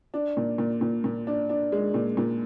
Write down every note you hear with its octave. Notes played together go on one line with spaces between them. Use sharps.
D4
A#2
A#2
A#2
A#2
D4
D4
G#3
A#2
A#2